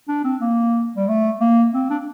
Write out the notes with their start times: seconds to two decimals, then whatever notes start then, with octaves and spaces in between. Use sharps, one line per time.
0.09 D4
0.24 C4
0.41 A#3
0.96 G3
1.08 A3
1.40 A#3
1.74 C4
1.90 D4